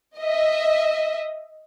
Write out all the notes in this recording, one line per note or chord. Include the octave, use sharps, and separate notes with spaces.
D#5 E5